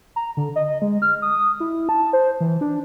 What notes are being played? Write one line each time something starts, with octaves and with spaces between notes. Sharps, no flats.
A#5
D3
D#5
G#3
F6
D#6
E4
A5
C5
E3
D4